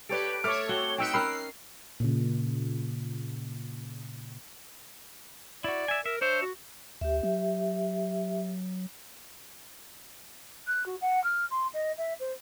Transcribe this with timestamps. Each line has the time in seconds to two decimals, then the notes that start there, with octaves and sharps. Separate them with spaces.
0.09 G4 A4 B4 C#5 D5 D7
0.44 A3 A4 C#5 D6 F6
0.69 C4 F#4 G7
0.98 C4 D#4 B4 G5 E6 C#7 D7
1.14 C#4 A#4 G5 B5 E6 F#6 C7
2.00 A#2 C#3
5.64 E4 F#4 D5
5.88 E5 G#5
6.06 A#4 E5
6.21 D4 C5 C#5 E5
6.42 F#4
7.01 D2 G4 E5
7.23 F#3
10.67 F#6
10.86 F#4
11.01 F#5
11.24 F6
11.51 C6
11.74 D#5
11.98 E5
12.20 C5